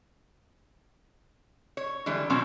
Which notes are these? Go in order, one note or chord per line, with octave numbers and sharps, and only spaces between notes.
C#5
D3 E3 G3 G#3
B2 F3 F#3 G#3 C4 C#4